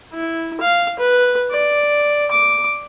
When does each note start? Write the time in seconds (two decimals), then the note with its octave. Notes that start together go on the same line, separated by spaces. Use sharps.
0.13 E4
0.61 F5
0.99 B4
1.52 D5
2.31 D6